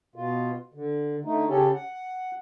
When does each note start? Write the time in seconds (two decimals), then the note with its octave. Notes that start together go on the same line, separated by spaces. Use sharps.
0.16 B2 F4
0.74 D3
1.25 D3 A3 D#4
1.49 C#3 C#4 G4 A4
1.74 F#5